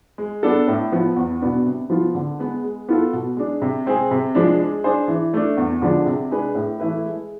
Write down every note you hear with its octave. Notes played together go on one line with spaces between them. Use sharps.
G#3
B3 D4 A4
A2
F3 B3
E2
B2 B3 D4
C3
F3 B3 F4
D3
G#3 B3
G#3
B3 F4 A4
B2
G#3 D4
C3
G#3 C4 G#4
C3
F3 G#3 D4
G#3
D4 G#4 C5
E3
A3 D4
E2
D3 F3 G#3 D4
C3
G#3 D4 G#4 B4
A2
E3 A3 E4 B4
G#3